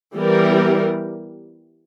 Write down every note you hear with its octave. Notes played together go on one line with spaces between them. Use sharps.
E3 G3 B3 G4 A#4